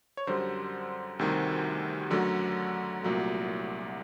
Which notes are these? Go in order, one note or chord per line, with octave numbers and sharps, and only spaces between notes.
C#5
F#2 D3 G3 C5
D2 C3 D#3 G3
F#2 D3 F#3 A3
C2 A#2 F#3 A3